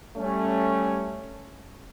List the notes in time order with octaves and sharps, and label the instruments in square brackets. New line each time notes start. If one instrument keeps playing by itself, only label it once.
[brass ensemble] G3 A3 C#4